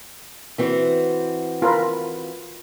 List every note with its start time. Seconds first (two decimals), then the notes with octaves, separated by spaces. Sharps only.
0.58 E3 C4 F#4
1.62 F4 A#4 B4